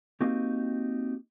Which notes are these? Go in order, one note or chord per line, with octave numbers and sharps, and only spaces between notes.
A#3 C4 D#4 F#4 G4